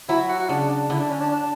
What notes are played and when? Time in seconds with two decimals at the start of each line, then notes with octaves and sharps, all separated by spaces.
0.09 F#3 E4
0.29 F#4
0.40 F#4
0.49 C#3 D4
0.69 D4
0.90 D3 E4
0.99 D4
1.09 C#4
1.20 D4
1.31 D4